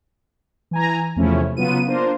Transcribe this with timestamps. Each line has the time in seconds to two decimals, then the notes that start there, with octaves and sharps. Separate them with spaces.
0.71 E3 G#5 A#5
1.16 E2 C3 F3 A3 C#4 E4
1.57 C#3 F#3 B3 F4 D#7
1.86 A#3 D4 F4 A#4 C5